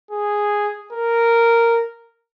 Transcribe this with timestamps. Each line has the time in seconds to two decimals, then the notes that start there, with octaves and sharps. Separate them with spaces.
0.11 G#4
0.93 A#4